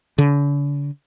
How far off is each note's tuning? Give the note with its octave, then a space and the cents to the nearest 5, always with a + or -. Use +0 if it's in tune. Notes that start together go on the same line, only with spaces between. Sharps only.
D3 -45